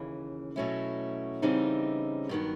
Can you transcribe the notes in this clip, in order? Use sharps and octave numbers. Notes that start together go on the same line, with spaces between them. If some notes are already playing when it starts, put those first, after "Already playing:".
Already playing: D#2 C#3 E3
B2 F#3 A3 C#4 E4
C#3 E3 G3 C4 D#4
G2 D#3 F#3 B3